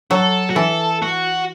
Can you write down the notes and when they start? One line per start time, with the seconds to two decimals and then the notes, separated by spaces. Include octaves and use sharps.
0.11 F#3 A4
0.50 F#4
0.56 E3 A4
1.02 F#4